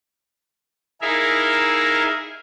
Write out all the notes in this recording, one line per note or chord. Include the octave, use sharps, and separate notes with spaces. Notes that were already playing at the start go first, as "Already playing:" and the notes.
D#4 E4 G#4 A#4 E5 F5